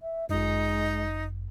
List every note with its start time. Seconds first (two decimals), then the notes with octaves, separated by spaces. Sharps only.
0.01 E5
0.29 G1 F#2 G#3 D#4